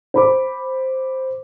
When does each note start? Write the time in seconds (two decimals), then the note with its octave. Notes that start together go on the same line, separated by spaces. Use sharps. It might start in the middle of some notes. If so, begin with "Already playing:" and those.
0.14 C5 B5 D6